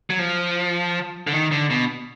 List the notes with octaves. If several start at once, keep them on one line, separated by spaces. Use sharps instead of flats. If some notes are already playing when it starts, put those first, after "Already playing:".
F#3
F3
D3
D#3
D3
B2